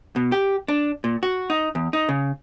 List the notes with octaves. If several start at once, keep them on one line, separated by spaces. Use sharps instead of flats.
B2
G4
D4
A#2
F#4
D#4
E2
D#4
C#3